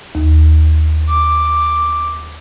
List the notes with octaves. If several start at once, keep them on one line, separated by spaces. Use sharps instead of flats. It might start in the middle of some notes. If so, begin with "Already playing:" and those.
D#2
D6